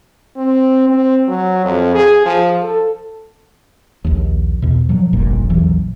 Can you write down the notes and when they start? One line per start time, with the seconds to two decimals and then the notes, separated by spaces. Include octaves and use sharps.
0.37 C4
0.89 C4
1.28 F#3
1.65 F2
1.95 G#4
2.26 F3
2.63 A4
4.04 A#1 D#2
4.62 E2 B2
4.89 A#2 F3 F#3
5.13 F1 A#1 G2 A#2
5.50 A#1 E2 E3 F#3